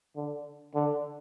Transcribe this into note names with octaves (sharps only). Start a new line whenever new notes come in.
D3
D3